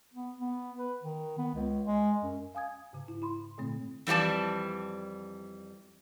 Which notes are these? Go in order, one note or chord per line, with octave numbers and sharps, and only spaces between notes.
B3
B3
B4
D#3
B3
C#2
G#3
F#2
F5 G#5 D#6 G#6
G#2 C#3
E4
E4 B5 C6
A#2 D3 A3 C4
F2 E3 G3 D5 A5